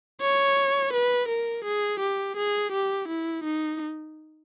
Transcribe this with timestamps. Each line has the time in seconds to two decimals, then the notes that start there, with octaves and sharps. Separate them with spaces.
0.21 C#5
0.93 B4
1.29 A#4
1.65 G#4
2.00 G4
2.37 G#4
2.72 G4
3.08 E4
3.44 D#4